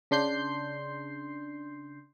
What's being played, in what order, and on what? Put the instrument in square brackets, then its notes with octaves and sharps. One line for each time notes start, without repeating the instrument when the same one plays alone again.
[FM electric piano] C#3 D4 C6 G6 C7